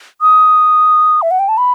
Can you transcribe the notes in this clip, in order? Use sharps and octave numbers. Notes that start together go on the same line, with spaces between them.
D#6
E5
F#5
G5
A5
B5